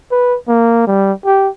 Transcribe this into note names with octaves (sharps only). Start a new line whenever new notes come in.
B4
A#3
G3
G4